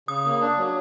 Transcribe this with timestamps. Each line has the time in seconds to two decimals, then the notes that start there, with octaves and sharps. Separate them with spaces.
0.08 C#3 D#6
0.25 A#3
0.41 D4
0.58 F#3